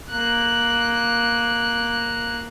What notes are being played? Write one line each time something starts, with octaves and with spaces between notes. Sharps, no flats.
A#3 F#6